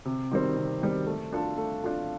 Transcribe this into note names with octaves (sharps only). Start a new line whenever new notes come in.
C3
D#3 G3 C4
C3
D#3 G3 C4
A3
D4 F4 A4
A3
D4 F4 A4